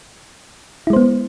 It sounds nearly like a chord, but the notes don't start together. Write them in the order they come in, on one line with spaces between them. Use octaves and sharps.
E4 G#3 C5 B3